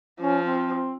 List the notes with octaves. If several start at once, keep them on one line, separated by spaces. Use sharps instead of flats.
F3 C#4
C4